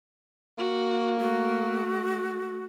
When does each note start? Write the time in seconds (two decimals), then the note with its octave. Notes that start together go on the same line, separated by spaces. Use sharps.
0.58 A#3 F#4
1.20 A3 F#4